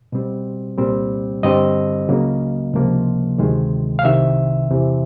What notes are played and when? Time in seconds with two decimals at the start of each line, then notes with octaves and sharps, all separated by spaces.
0.12 B2 G3 C4
0.78 C2 A#2 G3 C4
1.43 G2 D3 G3 C4 D#5
2.09 C#2 C#3 F#3 A#3
2.73 C#2 C3 F3 A#3
3.39 D2 C3 D#3 G#3
3.99 F5
4.04 C2 C3 D#3 E5
4.70 E2 C3 E3